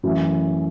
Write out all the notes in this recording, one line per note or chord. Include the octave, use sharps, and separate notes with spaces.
F#2 E3 A3